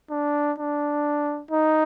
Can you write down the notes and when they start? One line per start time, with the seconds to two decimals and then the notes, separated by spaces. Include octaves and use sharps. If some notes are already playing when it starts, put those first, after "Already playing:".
0.10 D4
0.58 D4
1.51 D#4